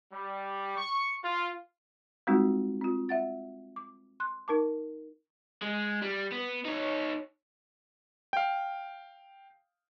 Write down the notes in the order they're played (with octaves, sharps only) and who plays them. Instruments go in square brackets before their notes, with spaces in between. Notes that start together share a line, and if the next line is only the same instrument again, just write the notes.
[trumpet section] G3
C#6
F4
[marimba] G3 G#3 C4 D#4 F4 F#4
C4 F4
E5 F#5 A6
D6
C6 F#6
D#4 A#4 A5 D6
[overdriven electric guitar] G#3
G3
B3
D#4 C#5
[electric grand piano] F5 G5